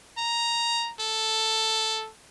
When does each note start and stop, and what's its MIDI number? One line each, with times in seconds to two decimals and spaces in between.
0.17 0.92 82
1.00 2.10 69